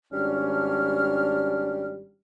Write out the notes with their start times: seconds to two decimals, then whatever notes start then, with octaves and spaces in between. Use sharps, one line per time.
0.13 G#1 G3 C#4 D4 F6